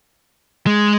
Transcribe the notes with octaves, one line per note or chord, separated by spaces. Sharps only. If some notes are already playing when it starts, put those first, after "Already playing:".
G#3